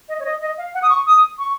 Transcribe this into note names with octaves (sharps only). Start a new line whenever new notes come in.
D#5
C#5
D#5
D#5
F5
F#5
D#6
C#6
D#6
C#6